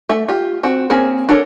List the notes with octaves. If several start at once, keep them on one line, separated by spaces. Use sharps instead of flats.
A3 E5
F4 G4
C4 F#4
A#3 C4 C#4 G#4
D4 A4 A#4 C#5